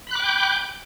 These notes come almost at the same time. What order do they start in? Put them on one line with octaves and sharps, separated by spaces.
B5 F#6 D6 G5 G6